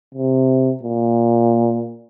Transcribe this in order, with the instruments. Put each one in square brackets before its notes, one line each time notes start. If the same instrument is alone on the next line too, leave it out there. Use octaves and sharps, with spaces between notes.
[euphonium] C3
A#2